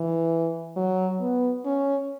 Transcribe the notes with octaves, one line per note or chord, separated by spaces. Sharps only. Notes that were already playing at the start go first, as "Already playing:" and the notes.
Already playing: E3
F#3
B3
C#4